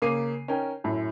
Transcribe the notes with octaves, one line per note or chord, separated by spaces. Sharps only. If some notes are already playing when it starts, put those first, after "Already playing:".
C#3 A#3 D6 C7 D#7
C#4 D#4 A#4 G5
F#2 A2